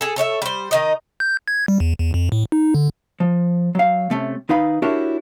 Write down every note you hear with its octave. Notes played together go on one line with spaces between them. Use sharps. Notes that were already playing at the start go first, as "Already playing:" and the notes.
G#4 A4
A4 C#5 D#5 E5
G3 C5
D#3 D#4 D#5
G6
G#6
G3
E2
E2
F2
A2
D#4
D3
F3
F#3 F5
C3 A3 C#4
D#3 D#4 B4 F5 B5
D4 E4 F#4 G4 A#4 C#5